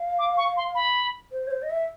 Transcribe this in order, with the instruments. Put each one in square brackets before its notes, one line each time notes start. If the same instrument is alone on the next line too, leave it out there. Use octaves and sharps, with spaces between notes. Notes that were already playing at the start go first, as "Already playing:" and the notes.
Already playing: [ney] F5
[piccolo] D6
C#6
C6
B5
[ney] C5
C#5
C5
D#5
E5